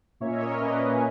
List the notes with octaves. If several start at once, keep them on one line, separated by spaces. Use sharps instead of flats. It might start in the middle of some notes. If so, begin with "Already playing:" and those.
A#2 A#3 C#4 C#5 E5
D#5
A#4 C#5
A#2 A#3 C#4 B4 D#5
G#5